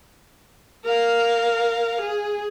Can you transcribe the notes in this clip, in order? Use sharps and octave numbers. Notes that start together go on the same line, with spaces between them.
A#4 F5
G#4